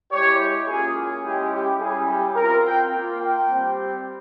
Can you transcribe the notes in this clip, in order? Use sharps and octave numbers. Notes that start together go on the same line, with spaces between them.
G#3 E4 G4 C#5
A#3 C#4 F4 G#4
G#4
G#3 C#4 E4 G4
G4
G3 C#4 E4 G#4
G4
C4 F4 A#4
G5
A#3 F4
G5
G3 C4 G4